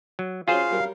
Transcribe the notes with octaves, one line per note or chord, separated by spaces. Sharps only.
F#3
F#3 C#4 F4 G#4 C5 F5
F#3 G3 A#4